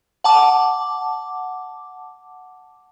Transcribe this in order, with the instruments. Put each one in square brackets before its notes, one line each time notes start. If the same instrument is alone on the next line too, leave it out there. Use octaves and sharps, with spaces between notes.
[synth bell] F#5 A5 D6